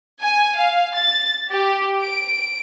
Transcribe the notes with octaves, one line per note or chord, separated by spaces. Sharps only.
G#5
F5
A6
G4
D7